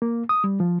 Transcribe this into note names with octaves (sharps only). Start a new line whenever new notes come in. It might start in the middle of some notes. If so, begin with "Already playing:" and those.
A#3
D#6
G3
F3